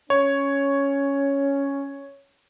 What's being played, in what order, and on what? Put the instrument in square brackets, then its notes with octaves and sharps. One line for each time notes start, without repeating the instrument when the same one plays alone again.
[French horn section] C#4 [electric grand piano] C#5